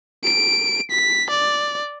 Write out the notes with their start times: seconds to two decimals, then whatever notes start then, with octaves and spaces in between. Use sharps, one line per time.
0.24 D7
0.91 B6
1.30 D5